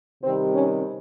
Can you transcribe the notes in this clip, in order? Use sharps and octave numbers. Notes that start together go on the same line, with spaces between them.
C3 D#3 G3 C4
C#4